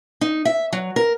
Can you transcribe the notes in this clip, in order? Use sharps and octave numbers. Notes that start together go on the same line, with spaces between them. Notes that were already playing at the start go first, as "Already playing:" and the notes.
D#4
E5
F#3
A#4